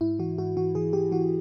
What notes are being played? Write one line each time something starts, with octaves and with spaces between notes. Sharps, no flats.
G#2 E4
E3 F#4
G#2 F#4
E3 F#4
E3 G#4
E3 G4
E3 F#4